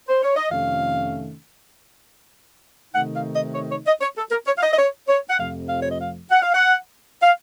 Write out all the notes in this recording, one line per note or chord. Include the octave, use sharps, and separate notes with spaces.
C5
C#5
D#5
F2 C3 D#3 A3 C#4 F5
C3 D#3 A3 D#4 F#5
F5
D#5
C#5
C#5
D#5
C#5
A4
A#4
C#5
F5
D#5
D#5
C#5
C#5
F#5
F2 C3 F3 A3 F5
F5
C#5
D#5
F5
F#5
F5
F#5
F5